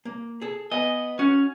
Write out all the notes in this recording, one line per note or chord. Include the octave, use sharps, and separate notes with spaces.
A#3
G#4 A4
B3 D#5 G#5
C#4 F#4